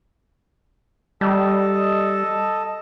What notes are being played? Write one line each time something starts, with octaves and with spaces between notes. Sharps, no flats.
G3 A4 D#5 A5